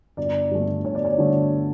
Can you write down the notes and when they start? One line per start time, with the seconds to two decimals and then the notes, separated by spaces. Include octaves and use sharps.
0.17 G1 D5
0.51 G2 D3 A3
0.85 G1 C#5
0.95 D5
1.05 C#5
1.18 G2 D3 A3